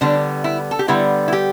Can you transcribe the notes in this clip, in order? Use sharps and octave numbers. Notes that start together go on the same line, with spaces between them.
D3 G3 B3 D4
E4
A4
G4
D3 G3 B3 E4
E4
G4